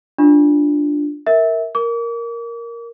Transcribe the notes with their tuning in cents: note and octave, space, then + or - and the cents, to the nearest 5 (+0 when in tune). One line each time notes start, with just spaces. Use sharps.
D4 +0 F4 +0
A#4 -10 E5 -20
A#4 +0 D6 -40